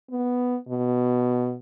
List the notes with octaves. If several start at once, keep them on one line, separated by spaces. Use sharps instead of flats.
B3
B2